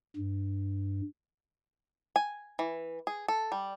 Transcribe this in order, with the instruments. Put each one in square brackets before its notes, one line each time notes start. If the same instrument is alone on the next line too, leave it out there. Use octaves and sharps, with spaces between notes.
[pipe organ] G2
[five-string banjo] G#5
E3
G#4
A4
G3